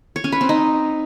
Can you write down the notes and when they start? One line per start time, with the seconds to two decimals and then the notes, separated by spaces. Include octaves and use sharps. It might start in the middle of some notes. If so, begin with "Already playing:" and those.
0.16 C#5
0.24 C#4
0.32 B4
0.41 C4
0.49 D#4